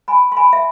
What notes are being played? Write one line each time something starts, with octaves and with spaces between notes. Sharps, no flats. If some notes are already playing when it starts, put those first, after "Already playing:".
G#5 B5
C6
G#5 B5
E5